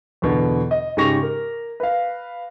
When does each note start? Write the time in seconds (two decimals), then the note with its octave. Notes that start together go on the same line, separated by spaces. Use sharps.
0.22 E2 B2 D3
0.71 D#5
0.97 G#2 C#3 G4 C#6 A#6 F7
1.23 A#4
1.80 B4 F5